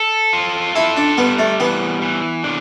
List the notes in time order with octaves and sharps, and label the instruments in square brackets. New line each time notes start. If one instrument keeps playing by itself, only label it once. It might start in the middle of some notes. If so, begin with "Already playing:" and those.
Already playing: [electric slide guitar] A4
F4
[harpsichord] E4 [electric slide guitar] A4
[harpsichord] D4
[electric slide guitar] G3 [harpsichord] B3
[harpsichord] A3
[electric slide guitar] E3 [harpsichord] B3
[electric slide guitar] E3
D4